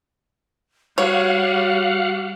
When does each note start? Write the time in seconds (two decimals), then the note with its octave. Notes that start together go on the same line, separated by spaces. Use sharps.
0.98 G3 F#4 C#5 F5 F#5